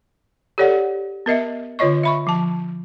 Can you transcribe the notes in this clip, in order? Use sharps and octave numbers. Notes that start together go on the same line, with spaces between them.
G4 A4 C#5 D5 F#5
B3 A#4 D#5 E5
D3 F4 C#5 D#5 C#6
E5 B5 C#6
F3 A5